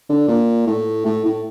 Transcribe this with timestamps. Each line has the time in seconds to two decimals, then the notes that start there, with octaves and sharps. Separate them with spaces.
0.09 D3
0.28 A#2
0.67 A2
1.06 A2
1.25 A2